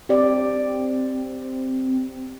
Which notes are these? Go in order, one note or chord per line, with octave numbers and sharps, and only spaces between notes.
C4 G4 D5